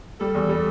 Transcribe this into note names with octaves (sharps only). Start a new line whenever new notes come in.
G3 A4
E2
G3